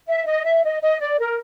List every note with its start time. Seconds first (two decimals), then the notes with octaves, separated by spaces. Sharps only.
0.08 E5
0.26 D#5
0.45 E5
0.64 D#5
0.82 D#5
1.01 D5
1.19 A#4